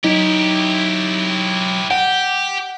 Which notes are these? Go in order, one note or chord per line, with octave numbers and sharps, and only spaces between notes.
F#3 D#4 E4 G4
G4 F#5